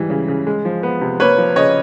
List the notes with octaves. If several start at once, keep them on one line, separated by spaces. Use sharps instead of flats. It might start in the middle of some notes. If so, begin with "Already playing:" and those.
Already playing: G#2 E3 G3
C#3
C#3
G#3
F3
B3
C3
A#3 B4 C#5
F3
C#3 C#5 D#5